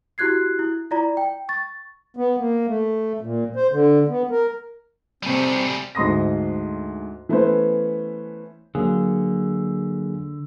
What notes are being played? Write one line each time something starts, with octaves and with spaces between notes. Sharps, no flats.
E4 F#4 G4 F#6 G#6 C7
E4
E4 F4 D5 A#5
G5
C#6 A6
B3
A#3
A3
A#2
C5
D3
B3
A#4
C3 G3 A3 C4 G#4
D2 G#2 C6 D#6 A#6
E3 A3 B3 C#4 B4 C5
D3 F#3 A#3 G#4